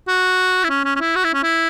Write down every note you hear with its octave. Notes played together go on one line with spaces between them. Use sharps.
F#4
E4
C#4
C#4
C#4
E4
F#4
E4
C#4
E4